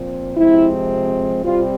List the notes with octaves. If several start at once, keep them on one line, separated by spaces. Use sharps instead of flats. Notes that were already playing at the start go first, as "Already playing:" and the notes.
Already playing: A#2 F3 C4
C3 F3 G#3 C4 E4
C3 G3 C4 F4